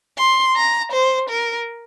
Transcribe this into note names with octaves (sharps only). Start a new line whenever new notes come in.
C6
A#5
C5
A#4